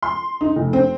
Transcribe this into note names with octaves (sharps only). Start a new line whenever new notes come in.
C6
D#4
F1
C4